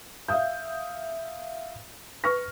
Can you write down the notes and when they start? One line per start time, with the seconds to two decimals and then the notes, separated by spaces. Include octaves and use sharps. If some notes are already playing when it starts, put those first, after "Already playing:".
0.28 E5 F5 D#6 G6
2.24 B4 C#6 F6 A#6